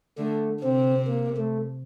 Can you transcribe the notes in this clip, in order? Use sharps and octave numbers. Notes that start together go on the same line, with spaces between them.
D3 A3
C3 C4
A#3
A3